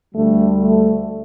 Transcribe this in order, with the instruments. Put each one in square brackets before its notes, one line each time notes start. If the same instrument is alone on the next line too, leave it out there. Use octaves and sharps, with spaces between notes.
[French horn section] D2 D3 G3 A3
A3